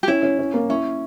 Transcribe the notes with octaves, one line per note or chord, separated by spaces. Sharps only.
G4
C#4 E4
C#4
C#4
A#3
C#4 E4